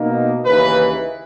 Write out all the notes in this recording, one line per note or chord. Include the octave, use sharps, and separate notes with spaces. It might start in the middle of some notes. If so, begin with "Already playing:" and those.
Already playing: B2 A#3 D#4
D#2 C#3 E3 A#3 D#4 B4